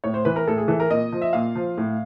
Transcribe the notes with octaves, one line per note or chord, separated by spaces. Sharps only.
A2 C#5
C5
E3 B4
A#4
A2 A4
G#4
E3 A4
A#4
A#2 D#5
F3
E5
A#2 F5
F3
A2